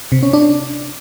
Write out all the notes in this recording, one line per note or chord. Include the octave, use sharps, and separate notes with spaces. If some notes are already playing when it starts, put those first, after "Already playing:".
C3
C#4
D4